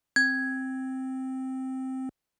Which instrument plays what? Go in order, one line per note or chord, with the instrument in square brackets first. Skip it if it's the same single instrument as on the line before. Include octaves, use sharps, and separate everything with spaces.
[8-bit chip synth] C4 [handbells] G#6